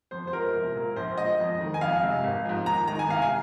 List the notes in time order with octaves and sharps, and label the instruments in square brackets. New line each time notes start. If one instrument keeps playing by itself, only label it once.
[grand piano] F2 C5
C5
F3 G#3 A#4
C2
A#2 A#3
A#1 C5
A#2 G#3 D#5
F2
D#3 G#3
G#5
F2 F5
C3 G#3
G#1
G#2 F3
D#2 A#5
D#3 G#3 A#5
G#5
C2 F5
G#5